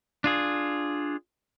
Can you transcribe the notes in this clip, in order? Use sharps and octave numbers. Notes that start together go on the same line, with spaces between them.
D4 F4 G#4